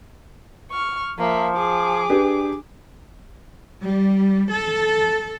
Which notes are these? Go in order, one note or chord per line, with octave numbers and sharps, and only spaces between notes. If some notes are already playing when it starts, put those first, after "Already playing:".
C#6 F6
F3 A#3 E5
G#4 D6
D4 G4 B4
G3
A4